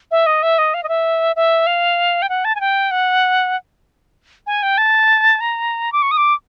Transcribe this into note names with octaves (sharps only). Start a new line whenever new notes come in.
E5
D#5
E5
D#5
F5
D#5
E5
E5
F5
G5
F#5
A5
G#5
G5
F#5
G#5
G5
A5
A#5
D6
C#6
D#6
D6